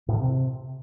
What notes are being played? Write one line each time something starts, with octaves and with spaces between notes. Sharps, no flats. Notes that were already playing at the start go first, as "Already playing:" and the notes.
A2
D3
C3